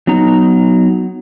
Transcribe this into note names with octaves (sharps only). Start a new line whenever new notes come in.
F#3 B3 D#4 A#5